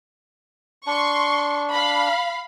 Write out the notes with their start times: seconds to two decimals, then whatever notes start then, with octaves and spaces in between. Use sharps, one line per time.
0.87 D4 C6 C#6
1.72 F5 B5